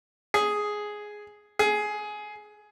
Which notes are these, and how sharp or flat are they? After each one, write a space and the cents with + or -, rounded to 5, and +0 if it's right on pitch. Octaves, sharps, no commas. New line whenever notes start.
G#4 +5
G#4 +15